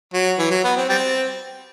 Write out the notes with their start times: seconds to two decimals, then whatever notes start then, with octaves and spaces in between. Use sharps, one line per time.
0.14 F#3
0.39 E3
0.51 F#3
0.64 B3
0.76 C4
0.89 G3 C4